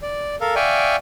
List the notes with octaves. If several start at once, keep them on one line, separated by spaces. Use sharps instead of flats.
D5
A4 A#4 F5
D5 E5 F5 G5 G#5 C#6